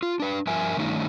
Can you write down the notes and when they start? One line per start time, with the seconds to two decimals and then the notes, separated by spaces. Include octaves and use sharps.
0.03 F4
0.20 D4 B4
0.47 G2 F3 A#4 E5 G#5
0.77 G2 D#3 A3 C#4 D#4